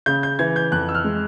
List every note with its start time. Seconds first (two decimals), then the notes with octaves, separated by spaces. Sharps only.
0.06 C#3 G6
0.23 G6
0.39 E3 G#6
0.56 G6
0.72 F2 F#6
0.89 E6
0.95 F6
1.04 G#3